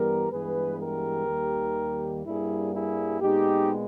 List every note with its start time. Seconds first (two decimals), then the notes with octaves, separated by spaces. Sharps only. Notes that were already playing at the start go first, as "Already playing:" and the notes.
Already playing: G2 E3 G3 B3 G4 A#4
0.30 G2 E3 G#3 B3 G#4 B4
0.79 G4 A#4
1.28 D#2 D#3 G3 A#3
2.25 G2 G3 A#3 E4 G#4
2.73 E4 G#4
3.21 A#2 G#3 B3 D#4 G4